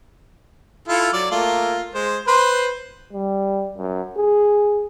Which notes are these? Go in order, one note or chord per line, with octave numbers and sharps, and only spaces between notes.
E4 F4 A4
F#3 D5
A3 A#3 F4
G#3 C5
B4 C5 C6
G3
F#2
G#4